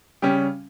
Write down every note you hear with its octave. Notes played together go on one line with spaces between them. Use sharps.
C#3 G3 C#4 G4